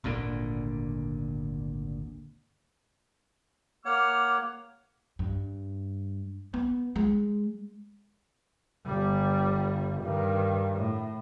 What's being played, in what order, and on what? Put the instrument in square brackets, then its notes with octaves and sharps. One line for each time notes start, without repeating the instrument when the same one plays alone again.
[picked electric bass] G#1 D2 A#2 D3
[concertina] A#3 C#5 F#5 [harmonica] D6 F6
[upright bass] G2
B3
G#3
[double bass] G1 G3
G2 D#3
A2